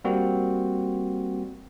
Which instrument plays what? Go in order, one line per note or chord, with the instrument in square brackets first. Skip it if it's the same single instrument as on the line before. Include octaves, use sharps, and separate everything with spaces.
[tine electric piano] G3 A#3 C4 F#4